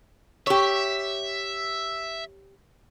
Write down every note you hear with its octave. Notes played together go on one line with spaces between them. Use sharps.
G4 C#5 E5